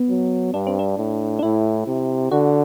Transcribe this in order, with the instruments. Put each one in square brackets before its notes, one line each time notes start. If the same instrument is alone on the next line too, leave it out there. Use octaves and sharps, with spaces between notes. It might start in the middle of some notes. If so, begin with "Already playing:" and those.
Already playing: [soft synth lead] B3
[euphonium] F#3
[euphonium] G2 [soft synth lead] D4
[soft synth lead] C4
D4
[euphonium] A2
[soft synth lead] D4
[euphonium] A2 [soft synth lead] E4
[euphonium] C3
[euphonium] D3 [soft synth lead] F#4